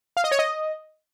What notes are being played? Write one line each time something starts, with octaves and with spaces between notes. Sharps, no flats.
F5
D#5
C#5
D#5